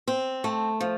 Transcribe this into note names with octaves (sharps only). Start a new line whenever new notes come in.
C4
A3
F3